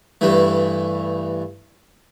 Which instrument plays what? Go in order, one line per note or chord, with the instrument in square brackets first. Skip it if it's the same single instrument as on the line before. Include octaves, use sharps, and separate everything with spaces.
[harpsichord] G2 E3 A3